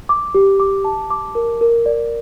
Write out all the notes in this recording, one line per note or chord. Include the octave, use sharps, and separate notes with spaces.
D6
G4
D6
A5
D6
A#4
A#4
D5